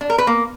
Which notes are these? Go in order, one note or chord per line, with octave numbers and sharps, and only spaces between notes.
D4
A#4
B4
A#3